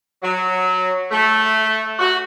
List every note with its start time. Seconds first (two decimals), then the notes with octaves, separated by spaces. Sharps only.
0.23 F#3
1.12 A3
1.99 F#4